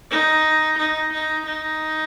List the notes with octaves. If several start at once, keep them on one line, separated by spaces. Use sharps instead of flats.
D#4
D#4
D#4
D#4